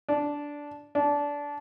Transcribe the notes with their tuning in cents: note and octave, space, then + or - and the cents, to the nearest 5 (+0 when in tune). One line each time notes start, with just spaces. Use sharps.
D4 -10
D4 -20